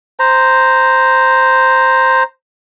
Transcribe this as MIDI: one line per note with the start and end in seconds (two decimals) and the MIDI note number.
0.19 2.23 72
0.19 2.23 82